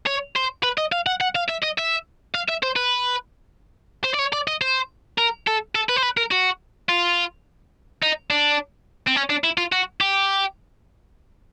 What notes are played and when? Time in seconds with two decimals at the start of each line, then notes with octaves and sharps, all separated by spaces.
0.06 C#5
0.36 C5
0.63 B4
0.78 D#5
0.92 F5
1.06 F#5
1.21 F#5
1.35 F5
1.48 E5
1.62 D#5
1.78 E5
2.34 F5
2.48 E5
2.63 C5
2.76 B4
4.04 C5
4.14 D5
4.19 C#5
4.33 D5
4.48 D#5
4.61 C5
5.18 A#4
5.47 A4
5.75 A4
5.89 B4
5.96 C5
6.03 B4
6.17 A#4
6.31 F#4
6.89 F4
8.03 D#4
8.30 D4
9.07 C4
9.16 C#4
9.30 D4
9.44 E4
9.58 F4
9.72 F#4
10.01 G4